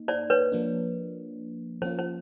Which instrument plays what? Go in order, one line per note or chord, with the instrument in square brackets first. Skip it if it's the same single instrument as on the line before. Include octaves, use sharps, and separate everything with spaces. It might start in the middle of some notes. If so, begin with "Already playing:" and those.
Already playing: [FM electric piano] A#3 D#4
[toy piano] C5 D5
B4 C#5
[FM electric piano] F3 A#3 D4
[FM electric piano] F3 A#3 C#4 F4 [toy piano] C5
[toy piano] C5